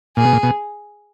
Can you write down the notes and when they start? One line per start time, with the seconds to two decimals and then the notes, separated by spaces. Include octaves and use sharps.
0.17 A#2 G#4
0.25 B2
0.33 A#2
0.43 B2